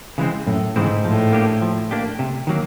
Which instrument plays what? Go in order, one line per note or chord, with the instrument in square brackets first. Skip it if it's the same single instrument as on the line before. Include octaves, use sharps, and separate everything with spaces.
[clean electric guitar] C#3 E3 G#3 C4
[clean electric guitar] F#2 [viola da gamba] A2
[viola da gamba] G#2 [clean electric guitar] C#3 E3 G#3 C4
[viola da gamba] A2 [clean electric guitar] F3
[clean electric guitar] A#3 D4 G4
F3
A#3 D4 G4
C3
D#3 F#3 A#3